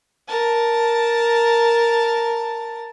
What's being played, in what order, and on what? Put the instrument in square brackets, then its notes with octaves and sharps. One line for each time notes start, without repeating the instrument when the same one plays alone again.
[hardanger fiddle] A#4 A5